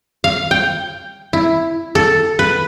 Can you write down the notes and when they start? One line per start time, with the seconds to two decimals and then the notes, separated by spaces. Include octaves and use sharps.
0.24 F5
0.51 G5
1.33 E4
1.95 A4
2.39 B4